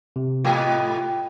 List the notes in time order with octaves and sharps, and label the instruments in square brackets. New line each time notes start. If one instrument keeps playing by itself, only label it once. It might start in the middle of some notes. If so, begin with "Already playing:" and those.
[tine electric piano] C3
[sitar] G#2 A3 B3 [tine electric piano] F4 [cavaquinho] G4